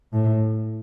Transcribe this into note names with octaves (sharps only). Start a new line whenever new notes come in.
A2